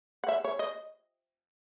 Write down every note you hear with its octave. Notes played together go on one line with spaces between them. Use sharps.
F#5
E5
C#5
D#5